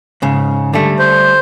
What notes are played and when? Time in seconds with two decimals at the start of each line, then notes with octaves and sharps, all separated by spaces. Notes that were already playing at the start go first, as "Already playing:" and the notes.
0.22 G#2 C#3
0.73 D3 G3 A3
0.99 C5